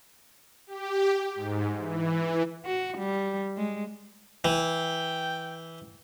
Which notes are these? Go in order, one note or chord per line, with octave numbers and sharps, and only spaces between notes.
G4
G#2
E3
F#4
G3
G#3
E3 G5